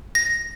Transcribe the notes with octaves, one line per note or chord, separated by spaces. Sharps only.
A#6